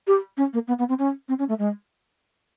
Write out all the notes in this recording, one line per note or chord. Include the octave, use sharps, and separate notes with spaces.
G4
C#4
A#3
B3
B3
C4
C#4
C4
C#4
A3
G#3